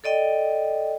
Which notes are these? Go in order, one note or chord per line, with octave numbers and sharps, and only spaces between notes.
A4 D5 D#5 G5